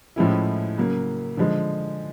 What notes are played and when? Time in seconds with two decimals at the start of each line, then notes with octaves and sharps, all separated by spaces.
0.16 A2 F3 G#3 C#4 E4
0.77 C#3 F#3 A#3
1.37 D3 F3 G#3